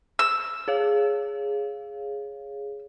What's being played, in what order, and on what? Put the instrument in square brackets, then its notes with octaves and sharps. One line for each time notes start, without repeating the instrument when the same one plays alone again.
[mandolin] E6
[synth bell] G#4 C#5 F5